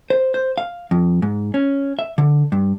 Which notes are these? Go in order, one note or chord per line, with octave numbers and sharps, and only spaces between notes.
C5
C5
F5
F2
G#2
C#4
E5
D3
G2